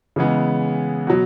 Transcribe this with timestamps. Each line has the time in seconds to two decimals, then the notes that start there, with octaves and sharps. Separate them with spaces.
0.16 C#3 E3 G#3 B3
1.07 B2 F#3